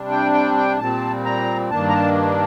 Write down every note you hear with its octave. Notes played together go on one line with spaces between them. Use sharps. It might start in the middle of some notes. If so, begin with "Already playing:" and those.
Already playing: C3 G3 D4
G5
G5
G5
A#2 G3 C4 A5
A#5
G2 D#3 A#3 D4 A5
A#5
A5